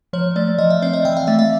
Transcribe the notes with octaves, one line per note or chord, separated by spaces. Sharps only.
F3 C#5
A3 D5
F3 D#5
E5
C4 D5
D#5
E3 G5
F5
A3 E5
E5